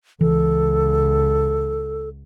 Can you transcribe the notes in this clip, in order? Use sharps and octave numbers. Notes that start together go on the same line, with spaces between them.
C#2 E3 A4